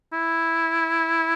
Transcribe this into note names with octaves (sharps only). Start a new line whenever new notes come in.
E4